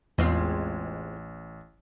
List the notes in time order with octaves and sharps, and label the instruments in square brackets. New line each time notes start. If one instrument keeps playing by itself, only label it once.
[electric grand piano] A1 [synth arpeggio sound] E2 [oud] G#3 C4 F4